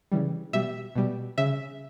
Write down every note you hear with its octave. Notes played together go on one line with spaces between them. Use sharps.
C#3 E3 G3
B2 G3 E5
B2 G3
C#3 E5